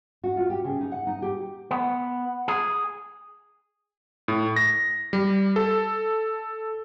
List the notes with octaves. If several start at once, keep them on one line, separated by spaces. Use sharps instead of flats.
F#4
F4
G4
C#3
D#4
F#5
D#4
G4
B3
G#4
A2
A#6
G3
A4